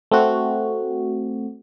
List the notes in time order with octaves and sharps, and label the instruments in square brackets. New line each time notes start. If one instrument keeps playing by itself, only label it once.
[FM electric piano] A3 C4 F#4